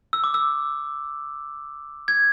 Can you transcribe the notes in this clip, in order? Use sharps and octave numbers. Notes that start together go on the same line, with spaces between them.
E6
D6
E6
G#6